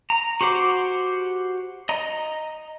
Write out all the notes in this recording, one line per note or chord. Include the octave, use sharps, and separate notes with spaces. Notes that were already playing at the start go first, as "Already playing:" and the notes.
A#5
F#4 G4 C5 F#5 D6
D#5 A#5